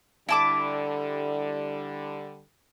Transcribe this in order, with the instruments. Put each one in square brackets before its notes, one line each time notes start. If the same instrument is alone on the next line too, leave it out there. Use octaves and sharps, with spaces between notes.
[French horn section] D3 G3 [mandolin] E4 A5 D6